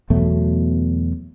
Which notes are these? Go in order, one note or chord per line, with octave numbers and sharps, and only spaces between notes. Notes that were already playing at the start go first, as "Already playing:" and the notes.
E2 B2 F#3 A3